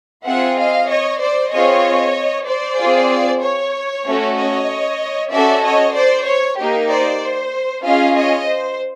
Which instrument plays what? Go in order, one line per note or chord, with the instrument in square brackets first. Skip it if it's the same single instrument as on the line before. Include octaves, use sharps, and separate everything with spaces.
[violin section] C4 F4 G#4 E5 F#5
D#5 F5
C#5 D#5
C5 D5
C4 F4 G#4 C#5 D#5
C5 D5
C4 F4 G#4
C#5
A3 C#4 F#4
C#5 D#5
C#4 F#4 A4 D5 E5
C#5 D#5
C5 D5
C#5
A#3 D#4 G4
C5 D5
C5
C#4 F4 G#4 D#5 F5
C#5 D#5
C5